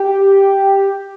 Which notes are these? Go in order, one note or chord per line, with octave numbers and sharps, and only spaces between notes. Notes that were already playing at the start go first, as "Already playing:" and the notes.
Already playing: G4